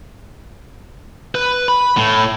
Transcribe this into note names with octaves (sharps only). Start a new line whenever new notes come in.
B4
B5
A2